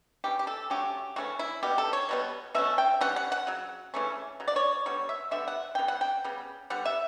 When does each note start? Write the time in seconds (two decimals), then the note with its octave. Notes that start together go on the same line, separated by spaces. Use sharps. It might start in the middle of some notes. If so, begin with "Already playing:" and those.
0.24 E3 G3 C#4 G4
0.39 G4
0.47 A4
0.70 D3 F#3 A3 C#4 G4
1.16 C#3 E3 A3 C#4 F#4
1.39 E4
1.63 B2 G3 B3 G4
1.78 A4
1.93 C#5
2.09 B2 G3 B3
2.55 B2 A3 C#4 E5
2.78 G5
3.01 E3 G3 C#4 F#5
3.16 F#5
3.32 F#5
3.47 C#3 F#3
3.94 C#3 E3 A3 C#4
4.40 C#3 F#3
4.48 D5
4.56 C#5
4.86 D3 G3 B3 C#5
5.09 E5
5.31 D3 G3 B3 E5
5.48 F#5
5.75 C#3 E3 B3 G5
5.88 F#5
6.01 G5
6.24 C#3 G3 B3
6.70 D3 G3 B3 F#5
6.85 E5